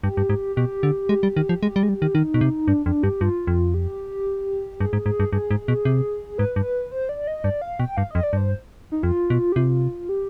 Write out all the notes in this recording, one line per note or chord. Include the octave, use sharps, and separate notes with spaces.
G2 G4
G2
G#2
B2 G4
D3
G#3
G3
D#3
F3
G#3
G3
G#3
G3
D#3
D#3 D#4
B2
C3
G2 D4
F2 D4
G2 G4
G2 F4
F2
G4
G2 G#4
G#2
G#2
G2
G2 G#4
G#2
B2
C3
G#2 B4
G2
C5
D5
D#5
G2 D5
F5
B2 G5
G2 F5
F2 D#5
D5
G2 C5
D#4
F2 F4
B2
G4
C3 F4
G4